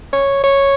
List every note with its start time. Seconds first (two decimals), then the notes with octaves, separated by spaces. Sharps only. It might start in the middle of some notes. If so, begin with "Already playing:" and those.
0.13 C#5
0.44 C#5